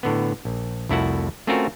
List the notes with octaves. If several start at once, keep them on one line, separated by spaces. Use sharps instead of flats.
A2 D3 B3
A#1
C2 F2 A3 E4 F#4 F#5
A3 C4 C#4 F4 F#4 A#4